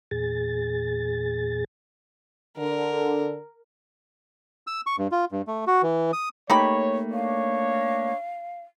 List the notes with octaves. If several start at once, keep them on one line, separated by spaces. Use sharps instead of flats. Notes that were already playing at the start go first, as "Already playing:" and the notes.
E2 A#2 G#4 A6
D3 A#4
E6
C#6
G2
F4
G2
A3
F#4
E3
D#6
A3 A#3 D#4 G4 C#5 B5
D4 C#5 F5